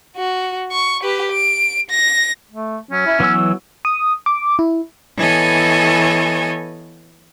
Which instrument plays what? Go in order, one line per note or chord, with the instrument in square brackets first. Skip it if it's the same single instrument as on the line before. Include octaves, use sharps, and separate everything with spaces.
[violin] F#4
C#6
G4 B4
D7
A#6
[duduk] A3
[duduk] F#3 [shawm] C#4
[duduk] E4
[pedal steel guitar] E3 F#3 E6 [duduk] B3
[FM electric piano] D#6
D6
E4
[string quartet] E3 B3 A4 C#5 D#5 G#5